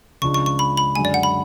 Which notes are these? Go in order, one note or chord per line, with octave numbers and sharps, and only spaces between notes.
C#2 C#3 F3 G#3 D4 C#6
C#6
C#6
B5
B5
F#2 D3 G#3 G#5
D5
F#5
B5